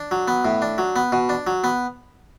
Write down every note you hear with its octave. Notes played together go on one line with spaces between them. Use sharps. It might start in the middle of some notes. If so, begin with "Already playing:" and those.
Already playing: D4
F#3
B3
A2
D4
F#3
B3
B2
D4
F#3
B3